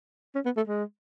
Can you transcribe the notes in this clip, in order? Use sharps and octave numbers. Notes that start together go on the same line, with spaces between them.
C#4
B3
A3
G#3